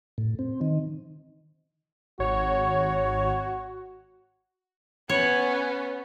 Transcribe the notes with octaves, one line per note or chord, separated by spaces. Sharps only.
A2
C4
D#3
G#1 F#4 C#5
B3 C#4 C#5